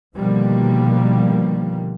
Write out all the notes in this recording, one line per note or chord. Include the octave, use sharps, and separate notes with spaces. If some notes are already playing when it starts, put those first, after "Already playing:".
B2 D3 D#3 F3 G3 A#3